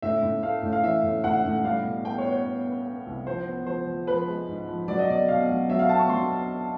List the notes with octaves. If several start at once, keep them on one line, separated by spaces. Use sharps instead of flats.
A2 E5
A2
A3 F5
A2
F5
E3 E5
A2
A2 F#5
A2
G3 F5
B2
B3 G5
C#5
B3
C#5
B3
B3
B3
C2
F3 C5
B3
F3 C5
F3
F3 B4
G#3
G#2
F3
F#3 D5
D#5
B2 D5
B2 F5
F#3
F#3 E5
F5
B3 A5
C#6
F#3 C6